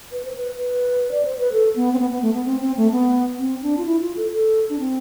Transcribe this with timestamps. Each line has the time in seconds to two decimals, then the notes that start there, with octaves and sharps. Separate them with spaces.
0.12 B4
0.25 C5
0.35 B4
0.58 B4
1.11 D5
1.25 C5
1.39 B4
1.52 A4
1.76 B3
1.93 C4
1.99 B3
2.11 B3
2.22 A3
2.34 B3
2.46 C4
2.61 C4
2.77 A3
2.92 B3
3.39 C4
3.62 D4
3.77 F4
3.86 E4
4.02 F4
4.17 A4
4.32 A4
4.69 D4
4.79 C4